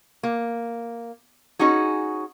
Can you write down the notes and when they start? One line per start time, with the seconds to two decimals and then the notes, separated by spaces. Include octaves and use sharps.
0.23 A#3
1.59 C#4 D#4 F#4 G#4